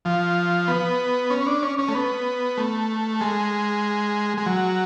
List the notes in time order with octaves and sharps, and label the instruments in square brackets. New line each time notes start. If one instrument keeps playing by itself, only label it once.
[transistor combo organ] F3
B3
C#4
D4
C#4
C#4
A3
B3
A3
G#3
G#3
F#3